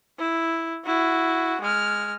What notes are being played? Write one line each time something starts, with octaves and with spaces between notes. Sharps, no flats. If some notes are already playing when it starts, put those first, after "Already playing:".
E4
E4 F#4
G#3 F6